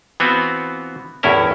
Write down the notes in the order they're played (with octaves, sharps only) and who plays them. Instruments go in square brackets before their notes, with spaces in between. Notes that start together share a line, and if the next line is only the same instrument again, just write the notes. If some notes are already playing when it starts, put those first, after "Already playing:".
[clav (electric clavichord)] E3 B3 C4 F4 F#4
G1 E2 A2 C#4 E4 A#4